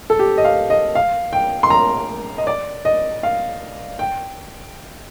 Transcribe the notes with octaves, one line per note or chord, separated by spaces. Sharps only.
A4
G4
D#5
F5
D#5
F5
G5
C6
A#5
D#5
D5
D#5
F5
G5